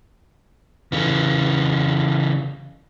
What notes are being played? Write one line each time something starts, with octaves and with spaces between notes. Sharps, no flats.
C#3 E3